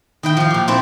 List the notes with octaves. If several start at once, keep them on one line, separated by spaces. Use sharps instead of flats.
D#3 E4 G5
F3 F5
A#2 G4
A3 C4 E4 C5 E5